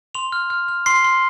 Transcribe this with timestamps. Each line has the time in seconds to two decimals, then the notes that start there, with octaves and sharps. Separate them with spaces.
0.15 C6 F7
0.32 F6
0.50 F6
0.68 F6
0.86 C6 C7
1.04 C6